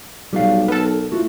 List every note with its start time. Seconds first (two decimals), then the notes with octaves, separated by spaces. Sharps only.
0.33 B1 G3 F#4 F5
0.68 B3 A4 A#4
1.12 A2 F4 F#4